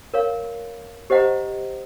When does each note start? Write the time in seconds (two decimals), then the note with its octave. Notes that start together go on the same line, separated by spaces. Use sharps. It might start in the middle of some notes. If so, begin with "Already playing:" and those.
0.14 A#4 C#5 F5
1.10 G4 C5 D#5 F#5 A#5